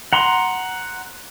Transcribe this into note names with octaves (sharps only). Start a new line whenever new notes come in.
F#5 A#5 C6